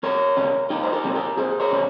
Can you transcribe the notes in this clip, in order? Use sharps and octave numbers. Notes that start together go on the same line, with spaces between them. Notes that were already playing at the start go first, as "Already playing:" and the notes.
C2 A#4 C#5
C3 G3 C#4
C2 D#4 G4
C5
G4 A#4
C3 G3 C#4
G4 A#4
C2 G#4 C5
A#4 C#5
C3 G3 C#4